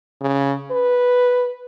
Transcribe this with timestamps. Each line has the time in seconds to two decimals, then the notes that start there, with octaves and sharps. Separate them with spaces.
0.21 C#3
0.71 B4